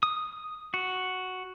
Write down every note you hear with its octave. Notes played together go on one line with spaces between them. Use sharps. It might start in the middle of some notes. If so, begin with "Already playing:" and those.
D#6
F#4